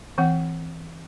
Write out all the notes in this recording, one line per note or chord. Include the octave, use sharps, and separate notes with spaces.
E3 C4 F#5